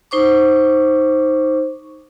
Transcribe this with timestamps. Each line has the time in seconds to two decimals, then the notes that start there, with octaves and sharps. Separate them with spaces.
0.11 D#4 C5 C#6 D6